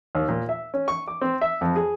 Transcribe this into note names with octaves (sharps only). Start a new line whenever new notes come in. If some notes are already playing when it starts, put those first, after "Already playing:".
D#2
A#2
E5
C#4
C#6
D6
C4
E5
F2
G#4